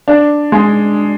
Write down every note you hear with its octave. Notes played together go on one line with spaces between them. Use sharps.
D4
G#3